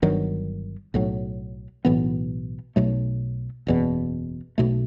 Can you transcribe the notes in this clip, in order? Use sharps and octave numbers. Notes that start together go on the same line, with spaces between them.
G1 G2 D#3 F#3
B1 A2 F#3
B1 A2 E3 B3
B1 B2 F#3 A3
F#1 E2 B2
B1 B2 A3